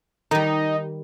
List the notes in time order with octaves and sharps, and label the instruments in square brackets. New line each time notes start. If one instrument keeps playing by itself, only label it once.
[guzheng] D#3 G3 [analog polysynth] D#4